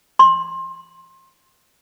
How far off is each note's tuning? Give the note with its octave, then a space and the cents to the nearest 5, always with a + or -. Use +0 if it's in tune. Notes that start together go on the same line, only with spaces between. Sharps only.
C6 +25